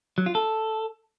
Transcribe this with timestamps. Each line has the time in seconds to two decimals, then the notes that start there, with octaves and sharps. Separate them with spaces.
0.18 F#3
0.26 F4
0.35 A4